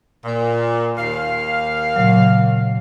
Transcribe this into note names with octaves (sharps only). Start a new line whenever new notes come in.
A#2
D#2 A#3 F5
A#2 C#3 F#3